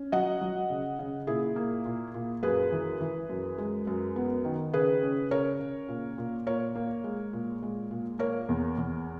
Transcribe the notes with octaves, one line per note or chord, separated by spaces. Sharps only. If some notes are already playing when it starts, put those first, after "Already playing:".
Already playing: C#4
F#3 D#5 F#5
F#3
C#3
C#3
A#2 E4 G#4
A#3
A#2
A#2
F#2 G#4 B4
E3
E3
F#2
G#3
F#2
B3
D#3
C#3 G#4 B4
C#4
C#3 A#4 C#5
C#3
A#2
A#2
A#2 A#4 C#5
A#3
G#3
A#2
G#3
A#2
A#3 A#4 C#5
E2
E2